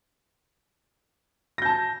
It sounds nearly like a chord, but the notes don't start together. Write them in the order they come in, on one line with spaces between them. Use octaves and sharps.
A#6 G6 A5